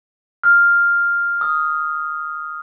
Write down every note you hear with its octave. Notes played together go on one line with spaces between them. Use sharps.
F6
D#6